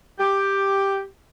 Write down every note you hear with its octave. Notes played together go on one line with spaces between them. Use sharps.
G4